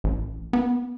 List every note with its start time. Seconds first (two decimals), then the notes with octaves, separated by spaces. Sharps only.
0.04 A1
0.53 B3